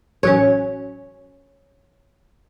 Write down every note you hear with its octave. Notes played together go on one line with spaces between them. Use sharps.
A1 F#3 C#4 C#5